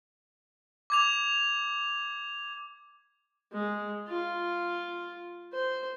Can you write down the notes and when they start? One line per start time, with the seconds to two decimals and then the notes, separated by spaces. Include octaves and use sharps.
0.90 D6 G#6 F7
3.53 G#3
4.08 F4
5.53 C5